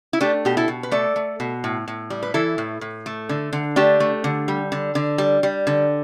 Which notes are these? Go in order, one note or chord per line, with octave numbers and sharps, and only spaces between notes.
E4
A3 D4 G4
B2 G4
E4 A4
B2
B4
A3 A4 D5
A3
B2
A2
A2
G3
B4
E3 E4 A4
A2
A2
A3
D3
D3
A3 D4 G4
A3
D3
G3
D3
D3
G3
G3
D3